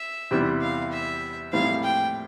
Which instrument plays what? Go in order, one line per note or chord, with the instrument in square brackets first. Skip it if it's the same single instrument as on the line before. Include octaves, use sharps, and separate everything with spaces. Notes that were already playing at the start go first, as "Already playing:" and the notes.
Already playing: [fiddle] E5
[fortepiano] E2 C3 G3 C4 E4
[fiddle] F5
E5
[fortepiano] A#1 A2 G3 C4 E4 [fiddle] F5
[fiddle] G5